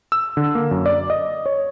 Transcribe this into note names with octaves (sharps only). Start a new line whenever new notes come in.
E6
D3
A#3
F#2
D5
D#5
C#5